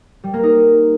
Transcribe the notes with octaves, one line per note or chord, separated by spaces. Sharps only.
G3
A#3
D#4